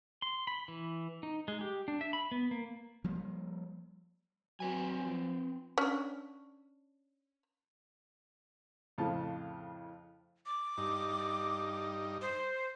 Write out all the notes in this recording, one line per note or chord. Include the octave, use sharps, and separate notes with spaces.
C6
B5
E3
D#4
G#3
G4
D4
E5
B5
B3
A#3
F3 G3 A#3
F#3 C4 B4 G#5
F3
C#4 D4
F2 A2 C#3 F4 A5
D6
G2 D#4
C5